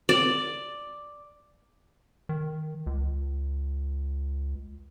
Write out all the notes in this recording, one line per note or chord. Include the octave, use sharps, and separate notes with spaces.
D5
D#3
C#2